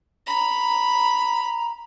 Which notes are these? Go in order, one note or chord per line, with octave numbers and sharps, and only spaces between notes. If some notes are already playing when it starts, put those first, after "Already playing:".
A#5 B5